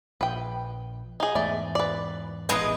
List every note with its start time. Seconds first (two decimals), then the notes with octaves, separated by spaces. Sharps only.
0.21 A#1 B4 G5
1.20 D#4 G#4
1.35 E2 G#2 A3 D5
1.75 B4 D5
2.49 E1 A1 E2 G#3 D#4 G#4 B4